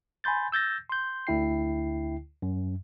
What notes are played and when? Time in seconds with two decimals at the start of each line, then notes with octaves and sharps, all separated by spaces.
0.24 G#5 B5 C6 G6 A6
0.52 E6 G6 A6 A#6
0.90 C6 G6
1.27 D2 D3 E4 G5 C7
2.42 F#2